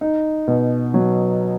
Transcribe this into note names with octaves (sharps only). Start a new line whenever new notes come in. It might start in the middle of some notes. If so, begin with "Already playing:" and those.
D#4
B2
F#3